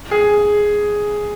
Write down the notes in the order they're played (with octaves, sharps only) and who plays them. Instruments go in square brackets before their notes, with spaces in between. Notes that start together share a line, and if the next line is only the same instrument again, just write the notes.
[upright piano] G#4